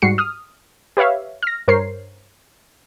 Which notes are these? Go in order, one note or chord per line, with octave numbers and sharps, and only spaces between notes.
G#2 G3 F#4 C7 C#7
D#6 F6
G4 B4 C#5 E5 F5
F6 A#6
G2 A#4 C5 C#5 C7